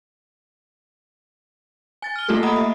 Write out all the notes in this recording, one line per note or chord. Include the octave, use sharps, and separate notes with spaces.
G#5 A6
F6 G7
A3 A#3 F4 G4 A4
D#5 F#5 A#5 B5 D#6
E5